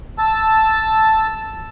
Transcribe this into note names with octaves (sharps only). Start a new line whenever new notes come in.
A5 E6